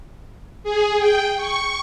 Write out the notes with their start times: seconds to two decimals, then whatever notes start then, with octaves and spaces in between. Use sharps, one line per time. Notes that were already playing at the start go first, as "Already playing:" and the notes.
0.64 G#4
0.98 G5
1.36 C#6